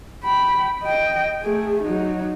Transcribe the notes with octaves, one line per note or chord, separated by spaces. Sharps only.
G5 B5
D#5 G5
A3 G#4
F#3 D#4